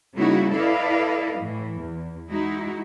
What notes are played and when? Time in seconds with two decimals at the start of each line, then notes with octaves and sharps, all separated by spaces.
0.15 C#3 G3 A#3 D#4 E4 F#4
0.54 E4 A4 B4 D5 D#5 F5
1.38 A2 E3
1.79 E2
2.30 G#3 D#4 E4 F#4